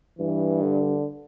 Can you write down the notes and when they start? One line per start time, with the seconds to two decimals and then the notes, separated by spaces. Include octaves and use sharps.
0.19 G2 E3
0.62 D3